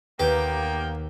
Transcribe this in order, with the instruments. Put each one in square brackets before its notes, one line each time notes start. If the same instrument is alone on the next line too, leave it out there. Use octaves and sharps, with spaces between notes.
[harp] D#2 [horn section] A#3 B3 G5 [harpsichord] G4 [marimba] B4